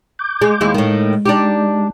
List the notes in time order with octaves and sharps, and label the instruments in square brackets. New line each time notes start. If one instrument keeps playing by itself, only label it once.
[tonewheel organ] D6 G6
[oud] G#3
D#2 G#3 E4
[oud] A2 D#3 [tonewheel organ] G#3
[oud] D4 D#4 G4